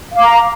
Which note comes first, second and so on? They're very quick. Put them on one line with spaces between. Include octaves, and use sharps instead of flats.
F5 D6 A#5